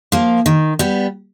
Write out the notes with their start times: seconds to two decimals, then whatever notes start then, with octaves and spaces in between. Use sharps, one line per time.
0.12 F3 A#3
0.46 D#3
0.79 G3 B3